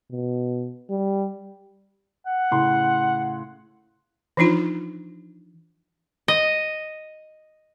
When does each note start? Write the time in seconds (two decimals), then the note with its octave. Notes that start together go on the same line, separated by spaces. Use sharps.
0.11 B2
0.90 G3
2.26 F#5
2.51 A2 C#3 C6
4.37 E3 F3 D4 D#4 F4 C6
6.28 D#5